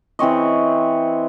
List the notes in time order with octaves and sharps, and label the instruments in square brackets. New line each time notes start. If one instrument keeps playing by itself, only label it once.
[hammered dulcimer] E3 C4 C#5 D#5